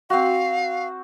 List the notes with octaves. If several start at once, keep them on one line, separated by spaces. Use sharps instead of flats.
C4 F#4 F5